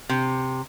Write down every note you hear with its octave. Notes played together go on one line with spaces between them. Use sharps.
C3